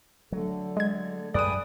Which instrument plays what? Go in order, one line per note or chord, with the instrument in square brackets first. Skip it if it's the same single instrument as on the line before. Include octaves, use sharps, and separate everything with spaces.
[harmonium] D3 [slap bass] F#3 A3
[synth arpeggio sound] G#3 G#6
[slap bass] F#2 [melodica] G#4 G5 D#6 [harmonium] B4 [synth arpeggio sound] D5 D#7